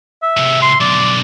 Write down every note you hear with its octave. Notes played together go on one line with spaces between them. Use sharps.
E5
A2 C3
C6
B1 D3 D5